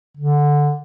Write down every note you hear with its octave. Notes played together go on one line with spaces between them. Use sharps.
D3